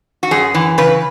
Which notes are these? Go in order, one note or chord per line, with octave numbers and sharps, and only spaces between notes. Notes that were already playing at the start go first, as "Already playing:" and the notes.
F#4
F#2 G#4
E3
C#3 B4